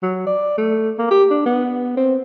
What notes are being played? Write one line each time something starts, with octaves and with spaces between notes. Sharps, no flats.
F#3
D5
A3
A#3
G4
D4
B3
C4